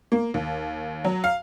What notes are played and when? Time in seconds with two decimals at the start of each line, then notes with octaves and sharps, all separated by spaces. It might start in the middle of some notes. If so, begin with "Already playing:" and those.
0.12 A#3
0.34 D#2
1.04 F#3
1.24 F5